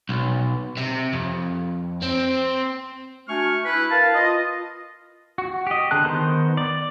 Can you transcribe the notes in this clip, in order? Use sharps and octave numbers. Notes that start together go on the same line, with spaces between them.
B1
C3
F2
C4
A3 D4 F#4 G#5 C#6 F6
E4 B4
A#4 B4 F5 A5
F4 D#5
F#4
G4 D#5
D3 G#4 A5 F#6
D#3 B3 D#4 C5
D5